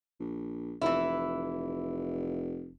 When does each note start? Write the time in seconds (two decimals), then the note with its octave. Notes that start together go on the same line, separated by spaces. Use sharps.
0.20 A#1
0.81 F1 E3 E4